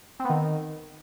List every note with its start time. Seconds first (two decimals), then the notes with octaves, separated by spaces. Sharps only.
0.20 C4
0.25 B3
0.30 D#3